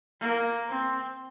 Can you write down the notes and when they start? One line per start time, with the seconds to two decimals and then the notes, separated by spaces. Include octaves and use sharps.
0.21 A#3
0.69 C4